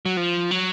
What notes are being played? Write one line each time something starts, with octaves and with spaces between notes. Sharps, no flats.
F#3
F3
F#3